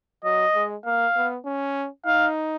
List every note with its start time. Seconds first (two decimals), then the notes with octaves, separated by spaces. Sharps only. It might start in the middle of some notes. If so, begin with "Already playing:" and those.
0.24 F#3 D#5
0.55 G#3
0.85 A#3 F5
1.16 B3
1.45 C#4
2.06 D#4 F5